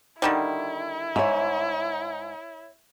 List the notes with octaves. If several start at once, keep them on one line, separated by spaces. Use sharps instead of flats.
D3 D#3 G3 E4
G#2 C#5 E5